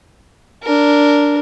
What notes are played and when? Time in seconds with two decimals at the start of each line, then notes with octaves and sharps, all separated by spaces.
0.63 D4 A#4